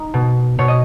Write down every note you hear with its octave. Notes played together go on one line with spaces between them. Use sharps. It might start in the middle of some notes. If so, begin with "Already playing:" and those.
Already playing: D#4
B2
B2 C#5
D#5